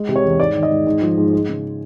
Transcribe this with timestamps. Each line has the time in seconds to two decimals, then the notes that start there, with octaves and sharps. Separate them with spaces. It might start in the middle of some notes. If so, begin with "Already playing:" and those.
Already playing: G#3
0.09 C3
0.16 C#5
0.24 E2
0.39 G#2 D5
0.55 D#3
0.63 D#5
0.71 G#2
0.87 G#2
1.02 F3
1.18 G#2
1.33 G#3
1.49 C#3